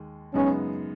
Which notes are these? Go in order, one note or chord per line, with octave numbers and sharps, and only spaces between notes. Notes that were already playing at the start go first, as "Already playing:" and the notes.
Already playing: D#2 G#3
F#2 C#3 G#3 B3 C#4 D#4